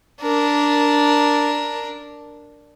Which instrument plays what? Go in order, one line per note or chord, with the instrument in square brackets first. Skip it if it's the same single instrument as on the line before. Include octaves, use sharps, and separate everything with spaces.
[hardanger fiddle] D4 A#4